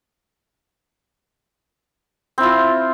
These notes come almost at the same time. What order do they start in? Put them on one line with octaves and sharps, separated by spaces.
C4 E4 F4